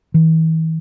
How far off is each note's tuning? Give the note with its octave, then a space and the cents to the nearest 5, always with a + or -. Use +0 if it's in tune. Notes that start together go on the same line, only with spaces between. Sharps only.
E3 -40